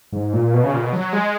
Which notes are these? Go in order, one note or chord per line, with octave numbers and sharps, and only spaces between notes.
G#2
A#2
B2
C#3
A#2
B2
F#3
G#3